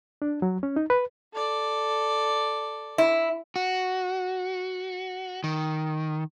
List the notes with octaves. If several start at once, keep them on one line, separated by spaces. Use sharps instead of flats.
D4
F#3
C#4
D#4
B4
A4 D5
E4
F#4
D#3